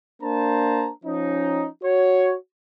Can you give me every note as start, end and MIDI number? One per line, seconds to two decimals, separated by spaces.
0.22 0.90 58
0.22 0.90 62
0.22 0.90 72
0.22 0.90 81
0.22 0.90 82
1.04 1.68 53
1.04 1.68 61
1.04 1.68 63
1.83 2.36 66
1.83 2.36 73